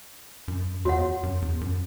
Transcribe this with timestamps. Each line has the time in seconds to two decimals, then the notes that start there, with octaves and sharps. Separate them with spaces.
0.48 F#2
0.85 E2 F#4 C#5 F#5
1.23 F#2
1.42 E2
1.61 F#2